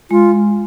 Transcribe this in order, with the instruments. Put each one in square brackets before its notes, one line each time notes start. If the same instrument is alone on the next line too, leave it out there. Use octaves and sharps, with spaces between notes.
[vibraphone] G#3 [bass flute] F4